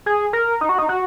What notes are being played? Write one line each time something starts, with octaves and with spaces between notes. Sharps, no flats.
G#4
A#4
D#4
F#4
D#4
F#4